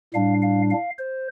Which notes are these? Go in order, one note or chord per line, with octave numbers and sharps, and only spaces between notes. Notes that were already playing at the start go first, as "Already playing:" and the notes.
A2 G3 D4 F5
F5
F5
C5